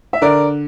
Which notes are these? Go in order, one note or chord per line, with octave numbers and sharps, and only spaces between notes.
E5
D3 A#4 D5